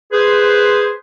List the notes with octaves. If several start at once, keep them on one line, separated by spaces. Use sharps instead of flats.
G#4 B4 C5